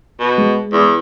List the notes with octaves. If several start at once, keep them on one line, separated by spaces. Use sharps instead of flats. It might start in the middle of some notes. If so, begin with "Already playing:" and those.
B2
G#3
E2